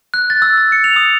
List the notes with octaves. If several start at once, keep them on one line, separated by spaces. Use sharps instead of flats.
F#6
A6
E6
E6
C#7
F7
D#6